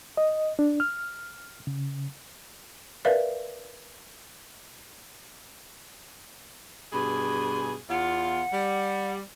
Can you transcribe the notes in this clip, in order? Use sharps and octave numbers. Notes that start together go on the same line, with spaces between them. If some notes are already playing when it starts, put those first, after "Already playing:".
D#5
D4
F6
C#3
A#4 B4 D5 E5 F5
G2 B2 G#4 B5
E2 F4 F#5
G3